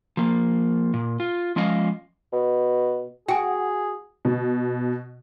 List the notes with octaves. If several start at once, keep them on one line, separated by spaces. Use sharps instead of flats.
F3 A#3
A#2
F4
F3 G#3 C#4 F4 D#5 F5
B2
F#4 G#4 G5 G#5
B2